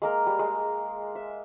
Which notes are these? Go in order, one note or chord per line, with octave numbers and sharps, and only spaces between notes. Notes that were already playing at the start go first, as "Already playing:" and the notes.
G#3 A#3 A#4
G3
G#3
E5